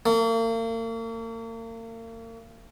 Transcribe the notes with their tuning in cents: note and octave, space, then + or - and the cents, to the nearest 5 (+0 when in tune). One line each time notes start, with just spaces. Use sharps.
A#3 -40